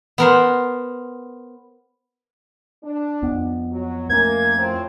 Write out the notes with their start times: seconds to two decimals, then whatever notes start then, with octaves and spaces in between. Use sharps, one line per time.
0.18 B3 A#4 C5
2.84 D4
3.22 F2 B3
3.71 F#3
4.09 F2 A3 A#3 C#4 G#6
4.57 A2 C4 F4